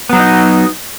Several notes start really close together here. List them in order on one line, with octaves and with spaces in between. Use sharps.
B3 F#3 F#4 D#4